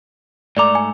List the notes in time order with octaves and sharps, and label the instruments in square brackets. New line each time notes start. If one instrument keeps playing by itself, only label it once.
[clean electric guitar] G#2 A3 A#5 [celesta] D5 D6
[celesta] G#5